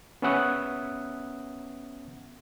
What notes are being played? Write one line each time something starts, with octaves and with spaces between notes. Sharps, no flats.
B3 C#4 E5 F#5 D#6